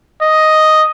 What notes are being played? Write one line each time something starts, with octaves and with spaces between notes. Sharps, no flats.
D#5